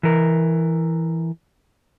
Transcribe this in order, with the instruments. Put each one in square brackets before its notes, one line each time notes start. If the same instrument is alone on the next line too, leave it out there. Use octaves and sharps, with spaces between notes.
[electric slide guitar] E3 A#4